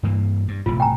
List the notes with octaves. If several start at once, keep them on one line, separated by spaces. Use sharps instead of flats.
G2 E3 A#3
G2
E1 A2 C3 F4
G5 G#5 A#5